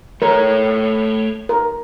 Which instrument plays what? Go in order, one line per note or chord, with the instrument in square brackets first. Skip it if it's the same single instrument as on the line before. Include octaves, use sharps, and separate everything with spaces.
[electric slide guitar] A3 C#5 [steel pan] A#4
[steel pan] A#4